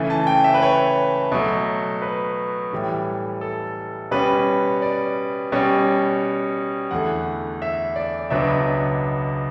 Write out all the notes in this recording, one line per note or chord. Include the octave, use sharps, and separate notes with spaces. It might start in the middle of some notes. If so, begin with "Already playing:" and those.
Already playing: C#3 E3 A3
A5
G5
E5
B4
C#5
B2 F#3 A3
B4
A2 E3 G3
A4
B2 G3 C#4 B4
D5
B2 G3 C#4
E2 D3 A3 F#5
E5
D5
C#2 B2 F#3 B3 D4 E5